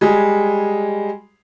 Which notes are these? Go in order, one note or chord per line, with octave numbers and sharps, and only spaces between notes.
G3 G#3 G#4